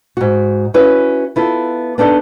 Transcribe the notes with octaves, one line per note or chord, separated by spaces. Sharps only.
G#2 F#4
C#4 E4 F#4 B4
B3 E4 F4 A4
B3 D4 D#4 A4 D#5